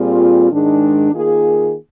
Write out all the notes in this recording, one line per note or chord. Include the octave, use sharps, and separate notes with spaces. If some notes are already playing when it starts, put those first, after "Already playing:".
Already playing: A#2 G3 C4 F4 G#4
G#2 D#3 G#3 D4
D#3 A#3 F4 G#4